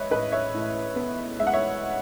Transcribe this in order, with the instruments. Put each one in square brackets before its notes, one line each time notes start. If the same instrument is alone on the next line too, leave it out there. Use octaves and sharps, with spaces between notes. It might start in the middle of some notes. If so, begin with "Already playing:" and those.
Already playing: [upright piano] G#3 B4 C#5 D#5 E5
A1 B4 D#5
C#5 E5
A2
B3
G#3 E5
F#5
C#5 E5